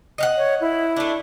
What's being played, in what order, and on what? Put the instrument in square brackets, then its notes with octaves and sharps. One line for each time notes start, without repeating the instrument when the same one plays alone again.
[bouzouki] D#5 F5 F#5
[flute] C#5
E4
[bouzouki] A3 D4